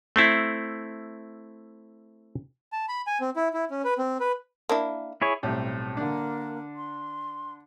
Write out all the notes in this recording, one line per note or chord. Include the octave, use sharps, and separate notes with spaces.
A3 C4 E4
A5
B5
G#5
C4
E4
E4
C#4
B4
C4
B4
A#3 D4 E4
E4 G#4 C#5
B1 A2 G3 C4
D3 A#3 D4
C6